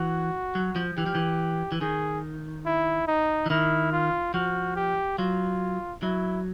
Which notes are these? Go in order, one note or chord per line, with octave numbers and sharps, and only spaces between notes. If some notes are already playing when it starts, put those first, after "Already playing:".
Already playing: E3 F#4
F#3
F3
E3 G4
F3
E3
E3
D#3 G#4
E4
D#4
E3
D#3 E4
F4
F3 F#4
G4
F#3 F4
F#3 E4